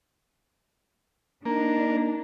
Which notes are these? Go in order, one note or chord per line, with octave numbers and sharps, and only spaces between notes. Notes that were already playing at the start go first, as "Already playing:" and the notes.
A#3 D4 D#4